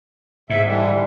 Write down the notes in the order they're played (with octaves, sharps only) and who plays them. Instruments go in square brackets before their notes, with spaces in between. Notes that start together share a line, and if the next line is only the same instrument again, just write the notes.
[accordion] E2 E5 [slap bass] G#2
[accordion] D3 E3 G3